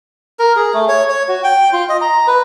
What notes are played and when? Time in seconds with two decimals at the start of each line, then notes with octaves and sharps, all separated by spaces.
0.39 A#4
0.56 G#4
0.74 A3
0.89 C#5
1.09 C#5
1.29 F#4
1.44 G5
1.72 F4
1.89 D#5
2.01 A#5
2.27 B4